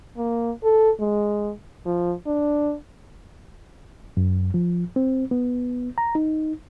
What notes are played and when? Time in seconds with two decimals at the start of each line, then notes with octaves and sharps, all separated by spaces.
0.17 A#3
0.64 A4
0.99 G#3
1.85 F3
2.27 D4
4.17 F#2
4.54 F3
4.96 C4
5.31 B3
5.98 A#5
6.15 D#4